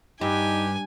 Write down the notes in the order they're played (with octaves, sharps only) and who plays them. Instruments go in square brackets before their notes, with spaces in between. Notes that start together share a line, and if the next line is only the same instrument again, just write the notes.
[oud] G2 [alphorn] D#4 [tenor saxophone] G4 [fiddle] G#5